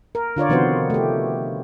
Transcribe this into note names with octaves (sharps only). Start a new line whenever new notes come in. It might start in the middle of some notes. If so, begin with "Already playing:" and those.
A#4
D3 F4 C#5 D5
C3 D#3 F3 B3 F#4 C5
A3 G4